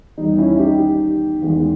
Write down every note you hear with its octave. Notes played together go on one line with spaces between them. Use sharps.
E2 D#3 G3 D#4
C#4 E4
D#4 G4
E2 D#3 G#3